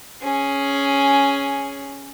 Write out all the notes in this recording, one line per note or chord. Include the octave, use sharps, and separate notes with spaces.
C#4 G#4